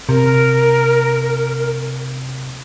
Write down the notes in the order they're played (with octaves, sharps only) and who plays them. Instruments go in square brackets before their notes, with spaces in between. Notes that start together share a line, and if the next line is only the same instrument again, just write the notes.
[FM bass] C3 [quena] A#4